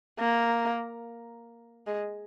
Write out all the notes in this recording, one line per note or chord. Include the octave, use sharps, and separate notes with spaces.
A#3
G#3